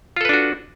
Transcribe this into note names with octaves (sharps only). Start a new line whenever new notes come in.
D4 F4 F#4 A4 B4